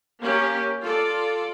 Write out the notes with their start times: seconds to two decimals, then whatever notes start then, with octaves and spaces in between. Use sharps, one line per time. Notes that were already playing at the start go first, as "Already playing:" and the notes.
0.21 A#3 C#4 G4
0.82 F4 A4 D5